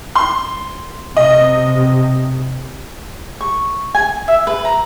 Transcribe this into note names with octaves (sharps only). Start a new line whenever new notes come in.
C6
C3 D#5
C#6
G#5
E5
B4
A#5